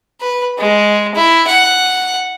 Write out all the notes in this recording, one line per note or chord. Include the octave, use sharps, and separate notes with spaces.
B4
G#3
E4
F#5